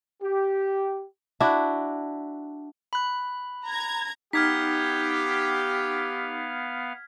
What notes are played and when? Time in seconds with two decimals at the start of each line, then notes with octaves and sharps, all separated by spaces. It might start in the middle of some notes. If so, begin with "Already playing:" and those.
0.22 G4
1.40 D4 E4 F#4
2.93 B5 F#6
3.66 A#5 G#6
4.33 B3 D#4 G4 F5 F6 G#6 B6